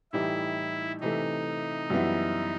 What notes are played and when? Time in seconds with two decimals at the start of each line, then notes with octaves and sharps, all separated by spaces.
0.12 A2 E3 G3 D#4 E4 G4
1.01 C3 E3 A3 D#4
1.90 F#2 E3 G3 B3 E4